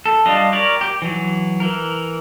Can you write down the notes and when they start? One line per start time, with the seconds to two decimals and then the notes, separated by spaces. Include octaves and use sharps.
0.06 A4
0.26 G3 D4 F4 D#5
0.52 G4 A#4 C#5 D5
0.81 G4
1.02 E3 F#3
1.60 E3 A#4